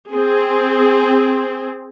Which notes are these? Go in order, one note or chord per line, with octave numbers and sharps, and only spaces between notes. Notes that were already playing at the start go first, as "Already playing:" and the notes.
C4 G#4